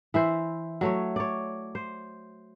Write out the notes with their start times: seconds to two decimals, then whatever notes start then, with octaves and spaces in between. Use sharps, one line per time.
0.14 E3 E4 C5
0.81 F#3 A3 C#5
1.16 C#5 D5
1.75 C5